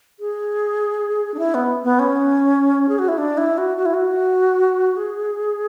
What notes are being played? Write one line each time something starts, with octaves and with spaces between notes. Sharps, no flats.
G#4
D4
E4
B3
B3
C#4
G#4
F#4
E4
D4
E4
F#4
F#4
E4
F#4
G#4